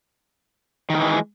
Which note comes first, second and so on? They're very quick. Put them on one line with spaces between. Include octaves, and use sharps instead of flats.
D#3 G3 E3 G#3